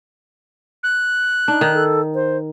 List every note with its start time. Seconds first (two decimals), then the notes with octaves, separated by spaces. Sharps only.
0.83 F#6
1.48 D4 D#4
1.61 D#3
1.74 A4
2.15 C5